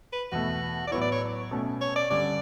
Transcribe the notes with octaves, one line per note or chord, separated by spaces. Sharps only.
B4
E2 B2 A3 F#4
D5
A2 F#3 B3 E4 C#5
D5
C#5
B2 A3 C#4
C#5
D5
G2 D3 G3 C#4 D5